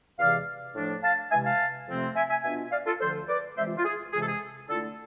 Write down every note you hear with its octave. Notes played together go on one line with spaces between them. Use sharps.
E2 C3 E3 G#3 D5 F5
A2 F3 A3 D4
F5 A5
C3 E3 G#3 E5 G#5
F5 A5
F2 C3 F3 A3 C4
E5 G#5
E5 G#5
B2 B3 D4 F4 E5 G#5
D5 F5
F4 A4
D2 D3 F3 A4 C5
B4 D5
C3 E3 G#3 C5 E5
F4
F4
G#4
F2 C3 E3 G#3 G#4
A4
G#4
D3 A3 E4 F4 A4